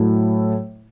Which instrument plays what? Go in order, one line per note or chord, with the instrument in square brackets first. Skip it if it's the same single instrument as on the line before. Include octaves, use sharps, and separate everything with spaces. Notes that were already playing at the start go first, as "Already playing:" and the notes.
Already playing: [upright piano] A2 F#3 A3 E4